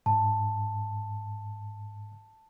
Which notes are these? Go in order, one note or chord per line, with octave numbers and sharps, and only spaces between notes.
G#2 A5